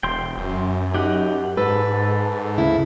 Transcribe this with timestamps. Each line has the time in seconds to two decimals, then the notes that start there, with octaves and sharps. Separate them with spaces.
0.03 E1 G5 C6
0.38 F#2
0.94 D#4 G4 F#5
1.57 G#2 A4 B4
2.58 D2 C#3 E4